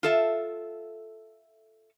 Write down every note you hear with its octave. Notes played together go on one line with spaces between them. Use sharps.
F4 A4 E5